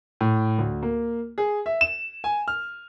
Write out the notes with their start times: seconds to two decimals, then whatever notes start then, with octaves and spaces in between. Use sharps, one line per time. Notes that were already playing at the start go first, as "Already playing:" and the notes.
0.21 A2
0.59 D2
0.83 A#3
1.38 G#4
1.66 E5
1.81 E7
2.24 G#5
2.48 F6